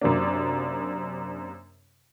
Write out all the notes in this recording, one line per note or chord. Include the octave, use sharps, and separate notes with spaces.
F#2 C3 A#3 D4